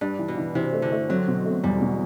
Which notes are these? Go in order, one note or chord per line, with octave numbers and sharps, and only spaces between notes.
G2 D4
E3
B2
E3
C3 E3
A3
D3
A3
F#3 C4
B2
A3
E2 G3
B2